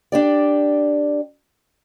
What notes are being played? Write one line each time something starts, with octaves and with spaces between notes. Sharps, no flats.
D4 G4 D5